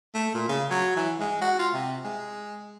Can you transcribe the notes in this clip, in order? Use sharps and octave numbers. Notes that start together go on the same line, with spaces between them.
A3
A#2
C#3
F#3
E3
G#3
F#4
F4
C3
G#3